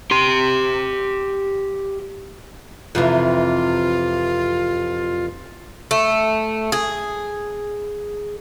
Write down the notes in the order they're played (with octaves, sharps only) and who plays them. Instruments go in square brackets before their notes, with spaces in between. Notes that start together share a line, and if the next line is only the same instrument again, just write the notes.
[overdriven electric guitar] G4 C6
[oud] F2 C3 E3 [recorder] F4
[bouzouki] A3
G#4